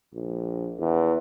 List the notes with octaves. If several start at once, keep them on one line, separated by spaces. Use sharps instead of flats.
A#1
E2